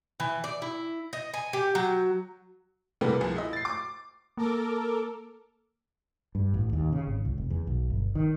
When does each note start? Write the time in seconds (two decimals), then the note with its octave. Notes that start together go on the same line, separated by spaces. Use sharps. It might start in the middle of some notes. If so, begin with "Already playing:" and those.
0.20 E3
0.44 D5
0.62 E4
1.13 D#5
1.34 G#5
1.53 G4
1.75 F#3
3.01 C3 E3 G3 A#3 B3
3.21 C2 F3 G#4
3.36 E4 D#5
3.53 A6 C7
3.65 D6
4.37 A#3 A4 A#4 D6
6.35 G2
6.54 A1
6.73 D#2
6.92 C#3
7.07 G#1
7.25 C#2
7.38 F1
7.50 E2
7.67 B1
7.90 G1
8.15 D#3